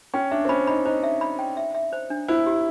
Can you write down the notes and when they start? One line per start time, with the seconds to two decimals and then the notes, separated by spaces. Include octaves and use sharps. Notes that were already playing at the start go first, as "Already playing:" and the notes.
0.14 C#4 G5
0.31 D4 E5
0.45 C4
0.49 C#4 B5
0.67 D#4 B5
0.85 D#4 C5
1.03 E5
1.21 B5
1.39 G5
1.57 E5
1.75 E5
1.93 C5
2.10 D4
2.28 E4 C5
2.46 G4